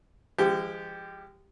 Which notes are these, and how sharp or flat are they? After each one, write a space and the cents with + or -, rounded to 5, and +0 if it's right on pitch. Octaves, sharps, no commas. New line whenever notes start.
F3 -35 G#3 -25 G4 +0